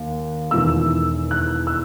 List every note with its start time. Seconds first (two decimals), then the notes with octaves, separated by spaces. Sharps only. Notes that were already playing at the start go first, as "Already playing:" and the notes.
Already playing: D#2
0.51 E1 E2 D#3 E6
1.31 F#6
1.67 E6